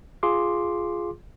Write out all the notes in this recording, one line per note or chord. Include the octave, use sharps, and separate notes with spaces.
F4 G#4 C6 D6